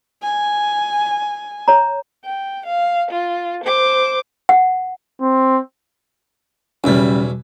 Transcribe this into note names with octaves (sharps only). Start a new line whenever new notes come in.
G#5
C#5 A#5
G5
F5
F4
C5 D6
F#5
C4
B1 E2 C#3 G3 E4